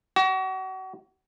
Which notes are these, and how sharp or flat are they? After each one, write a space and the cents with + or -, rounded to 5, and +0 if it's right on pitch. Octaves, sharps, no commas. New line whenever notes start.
F#4 +35